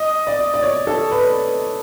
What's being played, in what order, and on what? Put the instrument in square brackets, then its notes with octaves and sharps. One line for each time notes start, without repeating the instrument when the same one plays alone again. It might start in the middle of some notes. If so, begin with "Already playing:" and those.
Already playing: [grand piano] D#5
D5
D5
C#5
A4
B4